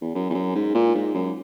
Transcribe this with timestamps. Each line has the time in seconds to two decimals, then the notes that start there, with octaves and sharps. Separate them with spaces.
0.01 E2
0.15 F#2
0.30 E2
0.34 F#2
0.55 G#2
0.75 A#2
0.95 G#2
1.14 F#2